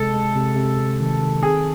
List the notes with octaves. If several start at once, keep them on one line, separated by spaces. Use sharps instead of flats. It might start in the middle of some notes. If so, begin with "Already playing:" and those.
Already playing: C3 G#3 A4
G#3
C3
C3
C3
D#3
D#3
C4 G#4